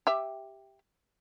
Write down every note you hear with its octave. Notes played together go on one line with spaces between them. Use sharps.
G4 E5